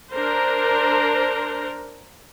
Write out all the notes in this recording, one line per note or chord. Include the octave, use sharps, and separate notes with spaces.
D4 A#4 C5